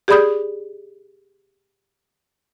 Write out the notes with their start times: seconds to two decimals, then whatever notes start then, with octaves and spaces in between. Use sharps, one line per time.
0.08 G4 G#4 D5 B5 D#6 G6